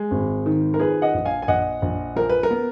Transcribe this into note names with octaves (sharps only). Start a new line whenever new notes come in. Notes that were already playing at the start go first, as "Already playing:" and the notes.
Already playing: G#3
G#1
D#3
A#4
F3 G#4 B4
D#5 F#5
A#1
F5 G#5
G#5
A#1 D#5 F#5
A#1
F3 A#4
B4
A#4
B3